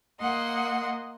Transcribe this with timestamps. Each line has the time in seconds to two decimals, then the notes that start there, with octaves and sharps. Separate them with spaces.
0.21 A#3 D#5 F#5 C6